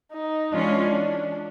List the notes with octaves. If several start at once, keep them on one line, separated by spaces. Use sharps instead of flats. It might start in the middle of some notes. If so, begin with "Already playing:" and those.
D#4
E3 G#3 C#4 D4 F4